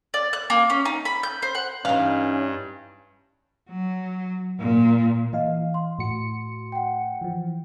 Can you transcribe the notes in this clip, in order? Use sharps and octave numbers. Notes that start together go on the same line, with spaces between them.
D5
F#6
A#3
C#4
D#4
B5
G6
C5
F#5
G2 E3 C#4 D#4 F5
F#3
A#2
E3 D#5 F5
C6
A2 F#4 C#7
F#5 G5
E3 F3